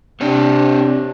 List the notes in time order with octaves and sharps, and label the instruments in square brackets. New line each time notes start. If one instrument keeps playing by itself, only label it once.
[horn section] C3 D4 [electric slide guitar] C4 C#5